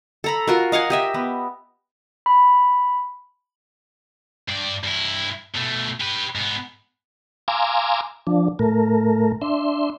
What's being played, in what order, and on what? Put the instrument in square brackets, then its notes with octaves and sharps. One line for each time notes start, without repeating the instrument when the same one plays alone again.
[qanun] A4 A#5 B5
F4 F#4 A#4
D#5 F5 F#5 G#5
G4 D#5 E5
B3
[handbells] B5
[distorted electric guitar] G2 D5
G2 E4
B2 A3
G4 B4
G#2 B3
[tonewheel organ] F5 G#5 A#5 C6 D6 E6
F3 D4
A2 A3 A#4
D4 E5 C6